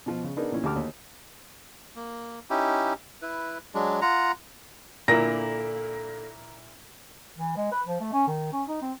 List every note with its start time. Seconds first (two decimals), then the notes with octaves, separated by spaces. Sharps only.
0.06 B2 F3
0.24 C#3
0.37 B3 D4 D#4 G#4 A#4
0.52 A#2 E3 C#4
0.63 D2 G4 A5 D6 F6
0.76 D#2
1.96 A#3
2.50 C#4 D#4 E4 G4
3.22 E4 B4
3.74 F#3 G#3 D4
4.02 F4 F#5 A#5
5.08 A#2 D3 A#3 E4 A#4 A#6
7.38 E3
7.57 G#3
7.72 B4
7.87 F3
8.01 A3
8.13 C#4
8.27 D#3
8.53 C#4
8.68 D#4
8.82 C4